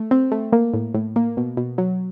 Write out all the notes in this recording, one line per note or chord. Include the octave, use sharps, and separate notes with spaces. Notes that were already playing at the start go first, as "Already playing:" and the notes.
Already playing: A3
C4
A3
A#3
A2
A2
A#3
B2
B2
F#3